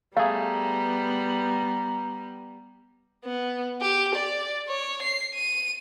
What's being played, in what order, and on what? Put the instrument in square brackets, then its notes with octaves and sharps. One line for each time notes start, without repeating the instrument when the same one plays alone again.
[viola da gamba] G3 B3 [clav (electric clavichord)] A3 G#4 [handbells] F5 [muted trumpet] A#5
[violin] B3
G4
D5
C#5
C7
D#7